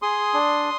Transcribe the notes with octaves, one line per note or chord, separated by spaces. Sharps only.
G#4 C6 D#6
D4